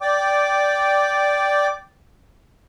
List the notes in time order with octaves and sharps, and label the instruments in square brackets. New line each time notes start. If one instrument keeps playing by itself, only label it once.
[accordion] D5 G5 D6